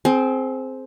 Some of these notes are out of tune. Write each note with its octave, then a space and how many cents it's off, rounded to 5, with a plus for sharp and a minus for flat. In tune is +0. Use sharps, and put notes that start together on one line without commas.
C4 +0 G#4 +35